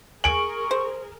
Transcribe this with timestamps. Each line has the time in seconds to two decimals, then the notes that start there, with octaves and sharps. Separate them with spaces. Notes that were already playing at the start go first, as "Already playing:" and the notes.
0.24 G#4 A#4 G#5 C#6 D7 F#7
0.71 C5